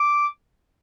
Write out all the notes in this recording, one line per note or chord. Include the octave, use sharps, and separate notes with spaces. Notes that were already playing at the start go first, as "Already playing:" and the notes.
Already playing: D6